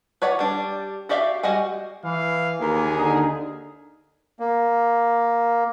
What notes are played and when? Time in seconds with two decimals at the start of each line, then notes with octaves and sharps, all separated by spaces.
0.22 B4 C#5 D5 F#5
0.39 G3 D4
1.09 F#4 G4 D5 E5 F5
1.43 G3 F#4 D#5 F#5 G#5
2.05 E3 F5
2.61 D#2 A#3 G#4
2.97 D3 D#4
4.40 A#3